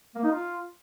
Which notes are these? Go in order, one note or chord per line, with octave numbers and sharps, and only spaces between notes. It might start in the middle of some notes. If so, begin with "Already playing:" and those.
A#3
D#4
F4